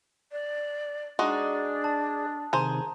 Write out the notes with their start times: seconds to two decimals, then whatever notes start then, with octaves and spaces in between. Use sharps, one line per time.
0.32 D5
1.19 G#3 D4 D#4 F#4 G#4 D5 D#6
1.84 A5
2.53 C3 D#3 G#4 C5 A#5